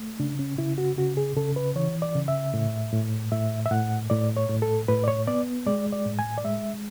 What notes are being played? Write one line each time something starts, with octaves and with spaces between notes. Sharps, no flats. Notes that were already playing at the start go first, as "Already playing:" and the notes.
Already playing: A3
C#3 D4
C#4
C#3 E4
F#4
C#3 F#4
G#4
C#3 A4
B4
E3 C#5
D5
C#3
E5
A2
A2
A2 E5
E5
A2 F#5
A2 D5
C#5
A2
A4
A2 B4
D5
C#5
B3 D5
G#3 D5
D5
A2
G#5
D5
G#3 E5